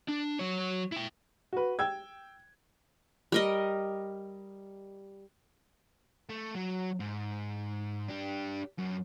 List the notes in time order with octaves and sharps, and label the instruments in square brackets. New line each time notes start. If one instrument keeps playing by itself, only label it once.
[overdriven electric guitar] D4
F#3 C#5
E4 G5
[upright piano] F#4 B4
G5 E6 G#6
[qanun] G3 A#4 D#5
[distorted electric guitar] A3
F#3
G#2
D4 G4
F#2